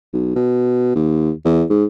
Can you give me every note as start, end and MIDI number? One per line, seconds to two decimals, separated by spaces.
0.13 0.34 35
0.36 0.91 47
0.95 1.32 39
1.45 1.64 40
1.70 1.85 44